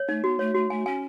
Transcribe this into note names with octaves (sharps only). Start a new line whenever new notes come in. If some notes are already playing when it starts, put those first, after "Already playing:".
Already playing: C#5
A3 D#4
B3 F#4
A3 C#5
A3 F#4
A3 G#5
C#4 G#5